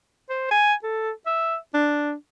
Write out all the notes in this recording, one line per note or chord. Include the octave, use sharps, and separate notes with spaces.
C5
G#5
A4
E5
D4